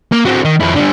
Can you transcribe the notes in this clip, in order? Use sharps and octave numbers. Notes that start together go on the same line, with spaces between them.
A#3
F#3 C4
D#3
F2 E4
D3 G3